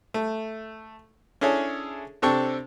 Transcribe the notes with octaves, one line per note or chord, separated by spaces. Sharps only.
A3
C#4 D4 E4 G#4 A4 C#5
C3 C4 D4 A4 G5 C#6